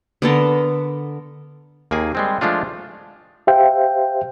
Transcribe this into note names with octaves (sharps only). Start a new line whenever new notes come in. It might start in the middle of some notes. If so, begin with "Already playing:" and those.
D3 B3 A4 A#4
D#2 A#3 G#4 G#5
G3 G#3 C4
F3 G#3 A3 D4 F4
G4 C5 E5 F5 G5